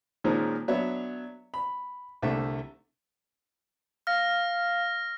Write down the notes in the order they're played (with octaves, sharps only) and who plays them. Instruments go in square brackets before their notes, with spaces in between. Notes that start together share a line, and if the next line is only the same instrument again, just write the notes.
[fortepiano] A#2 D#3 F3 G#3 C4 C#4
F#3 B3 D4 C#5 E5
B5
C2 D3 A3 E5
[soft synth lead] F5 [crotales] F6 A#6